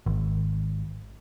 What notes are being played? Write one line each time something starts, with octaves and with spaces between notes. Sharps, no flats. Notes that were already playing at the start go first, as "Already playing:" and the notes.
G#1